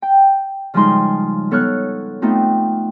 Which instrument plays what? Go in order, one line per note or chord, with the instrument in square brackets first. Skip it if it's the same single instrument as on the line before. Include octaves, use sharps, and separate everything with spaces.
[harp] G5
C#3 F3 G3 G#3 D#4 C6
B3 A4 C#5 C#6 F6 F#6
A3 B3 C4 D#4 F4